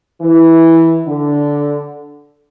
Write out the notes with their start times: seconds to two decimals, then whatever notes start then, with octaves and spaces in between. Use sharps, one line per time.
0.22 E3
1.07 D3